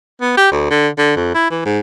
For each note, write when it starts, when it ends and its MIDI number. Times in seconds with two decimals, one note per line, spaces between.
0.21 0.37 59
0.37 0.47 67
0.52 0.66 38
0.71 0.88 50
0.98 1.15 50
1.16 1.30 41
1.35 1.48 64
1.51 1.62 52
1.65 1.80 44